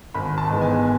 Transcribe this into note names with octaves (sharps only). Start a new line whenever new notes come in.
G#1 B5
A5
G#2 E3 G#3 B3
G#5